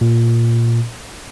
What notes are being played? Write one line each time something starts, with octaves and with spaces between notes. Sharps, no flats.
A#2